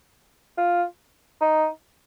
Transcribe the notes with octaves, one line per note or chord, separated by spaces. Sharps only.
F4
D#4